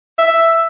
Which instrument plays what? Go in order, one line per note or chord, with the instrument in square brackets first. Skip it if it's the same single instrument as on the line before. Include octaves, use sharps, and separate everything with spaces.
[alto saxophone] E5